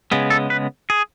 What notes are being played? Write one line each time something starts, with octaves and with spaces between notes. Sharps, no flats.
C#3 G#3 B3
A4
B4
G#4